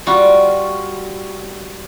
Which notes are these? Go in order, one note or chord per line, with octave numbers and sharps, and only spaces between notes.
G3 F4 F#4